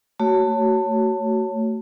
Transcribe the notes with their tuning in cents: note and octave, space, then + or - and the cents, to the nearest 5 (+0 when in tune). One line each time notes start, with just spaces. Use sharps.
A3 +20 F#4 +20 C#5 +0